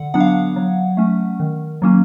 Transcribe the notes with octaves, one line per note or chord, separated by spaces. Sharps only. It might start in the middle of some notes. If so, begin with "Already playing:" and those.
Already playing: D3 F#5
F#3 B3 D4 F#5
F5
F#5
F#3
A3 C#4
D#3
F#3 A#3 C#4